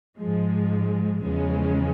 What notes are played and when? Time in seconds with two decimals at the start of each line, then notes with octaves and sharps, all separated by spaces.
0.18 G#2 F3 G#3
1.23 E2 C#3 F3 G#3 C#4